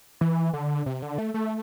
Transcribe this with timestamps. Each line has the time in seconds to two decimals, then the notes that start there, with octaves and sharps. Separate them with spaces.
0.21 E3
0.53 D3
0.86 C3
1.02 D3
1.18 A3
1.34 A3